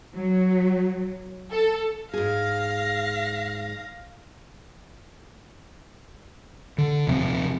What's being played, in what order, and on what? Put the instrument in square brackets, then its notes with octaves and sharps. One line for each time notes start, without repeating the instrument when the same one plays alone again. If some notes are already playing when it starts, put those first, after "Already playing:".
[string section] F#3
A4
[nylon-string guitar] G#2 G#4 [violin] F5 A#6
[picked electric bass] D3
D#1 C3 F3 C4